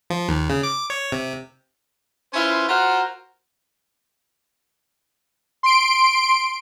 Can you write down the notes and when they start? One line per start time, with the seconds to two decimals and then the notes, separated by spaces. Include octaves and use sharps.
0.10 F3
0.28 D#2
0.49 C#3
0.63 D6
0.90 C#5
1.12 C3
2.34 C#4 E4 F4 B4 C5
2.69 F4 F#4 A#4 C5 F#5
5.63 C6 D7